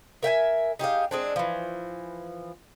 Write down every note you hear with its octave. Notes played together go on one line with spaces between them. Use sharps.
A#4 E5 G5 G#5
D#4 G4 G#4 F5
G#3 C4 D4
E3 F3